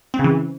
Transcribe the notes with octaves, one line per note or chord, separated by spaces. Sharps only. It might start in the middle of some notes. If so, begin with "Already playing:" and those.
C4
C#3
E3